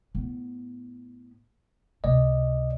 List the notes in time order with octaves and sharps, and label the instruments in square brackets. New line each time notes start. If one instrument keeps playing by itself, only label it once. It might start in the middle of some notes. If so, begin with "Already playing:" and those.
[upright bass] A2 B3
[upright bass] C#2 C3 [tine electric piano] D5 D#5